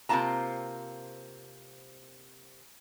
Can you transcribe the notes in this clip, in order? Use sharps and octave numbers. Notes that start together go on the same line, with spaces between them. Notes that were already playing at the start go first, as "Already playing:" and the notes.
C3 A#3 C4 F4 A5 A#5